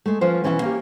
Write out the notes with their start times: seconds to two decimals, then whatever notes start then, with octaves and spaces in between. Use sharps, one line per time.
0.06 G#3 A3
0.21 F3 C#4 F4 B4 C5
0.44 B2 E3 C#4 E5 G5 G#5
0.62 A#3 C#4 G4